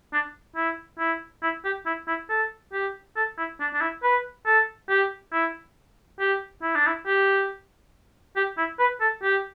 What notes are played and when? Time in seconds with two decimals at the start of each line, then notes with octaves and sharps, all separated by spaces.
0.13 D4
0.57 E4
0.99 E4
1.43 E4
1.65 G4
1.86 E4
2.08 E4
2.29 A4
2.73 G4
3.16 A4
3.38 E4
3.60 D4
3.74 D4
3.81 E4
4.03 B4
4.46 A4
4.90 G4
5.33 E4
6.20 G4
6.63 E4
6.76 D4
6.87 E4
7.07 G4
8.36 G4
8.58 E4
8.80 B4
9.01 A4
9.23 G4